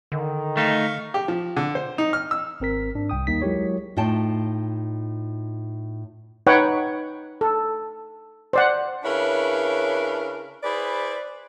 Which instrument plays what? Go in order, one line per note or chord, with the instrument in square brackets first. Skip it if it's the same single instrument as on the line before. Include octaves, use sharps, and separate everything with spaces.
[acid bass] D3 [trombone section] D#3
[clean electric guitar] A3 D#4 [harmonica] F5 C#6
[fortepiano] G4
F3
D3
C5
D#4
F6
E6
[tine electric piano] G#1 C4 A#4 B6
G#2 D4
C2 G5 D#6
D#2 G3 A#3 D#4 B6
F#3 G#3 E4 G4 A#4 C#5
[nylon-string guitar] A2 D#4 F4 G5 A5
[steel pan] D#4 B4 C#5 F#5 G5
A4
C5 D5 F#5
[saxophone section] C#3 D4 E4 A#4 B4 C#5
E4 G#4 B4 C5 D5